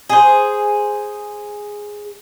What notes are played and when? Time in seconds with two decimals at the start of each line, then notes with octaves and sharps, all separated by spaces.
0.10 G#4 C5